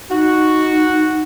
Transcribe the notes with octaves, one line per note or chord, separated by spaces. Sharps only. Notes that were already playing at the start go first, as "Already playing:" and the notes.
D#4 F#4